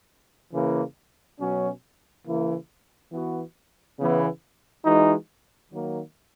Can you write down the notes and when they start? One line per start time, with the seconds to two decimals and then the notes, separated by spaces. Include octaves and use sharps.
0.52 C#3 E3 A#3
1.39 B2 F#3 C#4
2.25 C#3 E3 A#3 E4
3.11 E3 B3 F#4
3.97 C#3 E3 B3 E4
4.84 E3 G#3 D#4 F#4
5.70 D#3 F#3 A#3